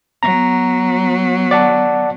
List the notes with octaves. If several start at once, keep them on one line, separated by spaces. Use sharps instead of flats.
F#3 B3 A#5
D5 F#5 A5